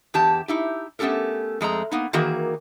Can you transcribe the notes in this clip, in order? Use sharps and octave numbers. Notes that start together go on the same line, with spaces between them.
E2 G4 A5
D#4 E4 G4
A3 B3 C#4 G4 A4 A#4
F2 G#3 A3 A#5
A#3 B3 D#4
D#3 E3 A#3 F#4 G#4 A#4